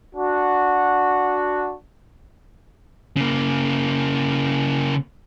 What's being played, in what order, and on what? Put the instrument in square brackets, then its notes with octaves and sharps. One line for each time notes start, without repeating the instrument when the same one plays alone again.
[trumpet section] D4 F#4
[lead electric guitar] C#3 A#3